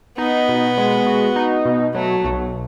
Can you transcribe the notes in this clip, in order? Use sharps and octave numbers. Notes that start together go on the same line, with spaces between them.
B3 D#4
B2
G#3
F#4
D#4
B2
F#3 A3
B1